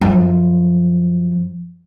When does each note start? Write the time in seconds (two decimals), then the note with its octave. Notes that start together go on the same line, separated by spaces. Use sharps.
0.01 F#2 F3